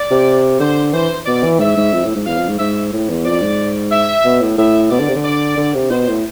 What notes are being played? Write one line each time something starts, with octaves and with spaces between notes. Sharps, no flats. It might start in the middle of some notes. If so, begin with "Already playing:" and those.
Already playing: D5
C3
D3 C5
E3 C5
B2 D5
E3
G#2 E5
G#2
F2
A2
G#2
E2 F5
F2
G#2
G#2 E5
A2
E2
F2 D5
G#2
E5
B2
A2
A2 E5
B2 D5
D3
C3
D3
D5
D3
C3
B2 C5
A2